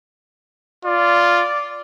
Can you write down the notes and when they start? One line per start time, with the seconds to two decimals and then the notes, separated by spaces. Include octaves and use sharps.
0.85 F4 D5